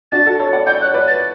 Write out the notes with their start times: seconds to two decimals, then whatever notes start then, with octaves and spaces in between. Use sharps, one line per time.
0.12 D4 F#4 A6
0.26 F#4 A4
0.39 A4 C#5
0.53 D5 F#5
0.66 D5 F#5 G6
0.81 F#6
0.84 C#5
0.94 B4 D5
1.07 A6